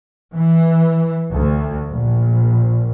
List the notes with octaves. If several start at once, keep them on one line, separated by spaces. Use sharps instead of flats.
E3
D2
A#1